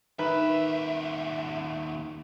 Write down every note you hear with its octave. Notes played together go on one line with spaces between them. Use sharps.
D#2 D#3 B4 E5